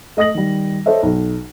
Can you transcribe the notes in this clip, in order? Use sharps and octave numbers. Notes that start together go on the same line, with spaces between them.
A3 D#5 D#6 A#6 F#7
D#3 G3
A4 C5 C#5 D#5 E5
B1